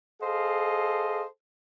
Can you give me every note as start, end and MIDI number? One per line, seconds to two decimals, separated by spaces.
0.22 1.25 68
0.22 1.25 69
0.22 1.25 72
0.22 1.25 75
0.22 1.25 77